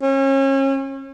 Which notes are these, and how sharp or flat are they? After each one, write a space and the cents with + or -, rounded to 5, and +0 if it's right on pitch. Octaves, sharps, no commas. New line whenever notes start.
C#4 -35